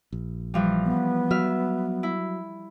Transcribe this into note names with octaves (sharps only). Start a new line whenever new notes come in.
A#1
E3 F3 G3
B3
F#3 E5 F6
E4